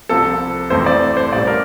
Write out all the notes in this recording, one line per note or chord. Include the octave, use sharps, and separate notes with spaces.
C2 C3 F3 C4 A4
F1 F2 E3 A3 C4 C5
D5
C5
A1 A2 G3 D5
A#4